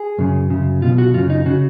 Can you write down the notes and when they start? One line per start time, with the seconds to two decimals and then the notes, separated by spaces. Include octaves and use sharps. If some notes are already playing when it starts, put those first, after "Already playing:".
Already playing: G#4
0.18 F#2 C#3
0.50 F#2 C#3
0.82 B1 B2 F4
0.98 F#4
1.14 F#2 C#3 F4
1.30 D#4
1.46 C#3 F#4